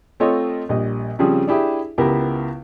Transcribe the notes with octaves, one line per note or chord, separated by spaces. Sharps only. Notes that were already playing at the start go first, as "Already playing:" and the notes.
A3 C4 F4 A4 C#5 D#5
A#1 G3 D#5
C#3 F3 G3 C4 G#4
D4 E4 G4 G#4 E5
C#2 B3 E4 G4 A#4